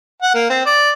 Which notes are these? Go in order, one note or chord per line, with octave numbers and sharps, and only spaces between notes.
F#5
A#3
C4
D5